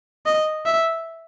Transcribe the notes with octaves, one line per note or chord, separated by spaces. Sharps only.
D#5
E5